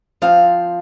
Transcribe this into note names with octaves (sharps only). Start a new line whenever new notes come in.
F3 C4 F5